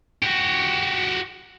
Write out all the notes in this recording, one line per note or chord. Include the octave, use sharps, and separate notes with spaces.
F#4 G4